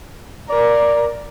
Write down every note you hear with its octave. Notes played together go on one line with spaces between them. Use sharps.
A#4 D5